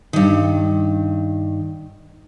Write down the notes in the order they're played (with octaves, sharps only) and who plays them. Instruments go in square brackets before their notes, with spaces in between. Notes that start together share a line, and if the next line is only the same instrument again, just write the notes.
[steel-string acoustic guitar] G2 D#3